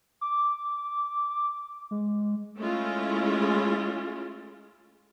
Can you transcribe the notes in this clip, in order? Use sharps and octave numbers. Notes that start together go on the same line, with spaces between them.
D6
G#3
G#3 A3 C#4 E4 F4